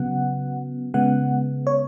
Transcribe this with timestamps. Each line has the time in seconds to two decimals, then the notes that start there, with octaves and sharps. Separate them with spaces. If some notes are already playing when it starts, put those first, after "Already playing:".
Already playing: C#3 F#3 B3 F#5
0.94 C#3 G#3 B3 F#5
1.67 C#5